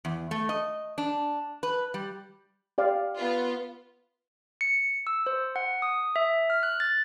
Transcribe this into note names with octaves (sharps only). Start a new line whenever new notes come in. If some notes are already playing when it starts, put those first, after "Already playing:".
E2
A3
D#5
D4
B4
G3
G4 D5 F5
B3 F4
C#7
E6
C5
F#5
D#6
E5
F6
F#6
A6